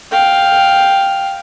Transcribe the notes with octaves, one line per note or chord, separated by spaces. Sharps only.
F5 G5